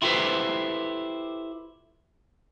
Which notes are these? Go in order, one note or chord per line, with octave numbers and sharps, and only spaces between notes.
E4 F4 G4 A4 B4 C5